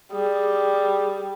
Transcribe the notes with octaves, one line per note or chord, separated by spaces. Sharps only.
G3 G#4